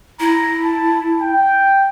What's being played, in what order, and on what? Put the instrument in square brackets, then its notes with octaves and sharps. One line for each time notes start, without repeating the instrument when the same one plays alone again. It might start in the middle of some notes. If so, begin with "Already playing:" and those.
[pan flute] E4 [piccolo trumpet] A#5
[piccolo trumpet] A5
G5